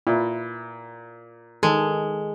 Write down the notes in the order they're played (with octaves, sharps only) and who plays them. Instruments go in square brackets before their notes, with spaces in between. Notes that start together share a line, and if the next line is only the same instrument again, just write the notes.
[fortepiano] A#2 [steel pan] E4
[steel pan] D#3 A4 [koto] G#3